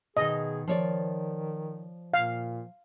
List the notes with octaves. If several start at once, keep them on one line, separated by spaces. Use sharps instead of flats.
B2 D#3 G#4 D#5
D#3 F3 C#5 D5
A#2 F5